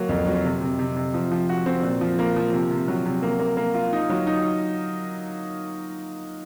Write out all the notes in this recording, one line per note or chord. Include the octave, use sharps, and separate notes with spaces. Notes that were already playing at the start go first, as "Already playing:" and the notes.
Already playing: F#3 A#3
F2
F#3
C3
C3
C3
C3
F3
F3
F#4
C4
A#2
F3
A#3
F3
C3
C3
F#3
C3
A#3
A#3
A#3
F4
D#4
F#3
D#4